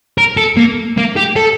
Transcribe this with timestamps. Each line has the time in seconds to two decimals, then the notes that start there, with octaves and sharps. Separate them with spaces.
0.18 A#4
0.37 A4
0.57 A#3
0.97 A#3
1.16 G4
1.36 A4